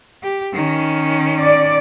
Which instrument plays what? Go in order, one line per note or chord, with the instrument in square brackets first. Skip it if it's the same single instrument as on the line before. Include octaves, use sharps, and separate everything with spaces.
[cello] G4
D#3 C#4
[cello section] D5